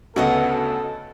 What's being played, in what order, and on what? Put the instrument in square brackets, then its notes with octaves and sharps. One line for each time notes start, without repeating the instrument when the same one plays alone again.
[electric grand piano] D2 C#3 B3 [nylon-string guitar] F#4 D#5 F#5 [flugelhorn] A4